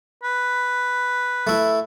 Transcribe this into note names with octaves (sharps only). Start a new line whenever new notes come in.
B4
A3 E4